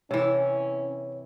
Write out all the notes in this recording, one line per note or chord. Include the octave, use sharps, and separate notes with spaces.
C3 E3 C#4 C#5